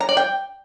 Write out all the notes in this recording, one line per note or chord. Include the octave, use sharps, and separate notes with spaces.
A#5
D5
G5